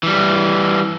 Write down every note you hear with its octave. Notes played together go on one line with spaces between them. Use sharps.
E3 G3